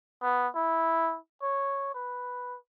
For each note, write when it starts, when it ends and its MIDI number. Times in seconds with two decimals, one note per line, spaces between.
0.22 0.48 59
0.55 1.17 64
1.42 1.90 73
1.94 2.57 71